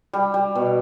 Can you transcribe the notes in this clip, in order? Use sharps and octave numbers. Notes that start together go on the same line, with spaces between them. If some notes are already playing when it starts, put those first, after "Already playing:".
G3
G3
B2